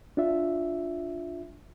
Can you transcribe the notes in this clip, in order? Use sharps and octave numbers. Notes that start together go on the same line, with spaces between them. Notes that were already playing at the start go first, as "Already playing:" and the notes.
D4 F4 E5